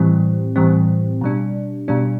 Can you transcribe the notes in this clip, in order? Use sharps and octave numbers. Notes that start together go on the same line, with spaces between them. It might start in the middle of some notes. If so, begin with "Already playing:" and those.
Already playing: A2 E3 G3 C4
A2 E3 G3 C4
B2 G3 D4
B2 G3 D4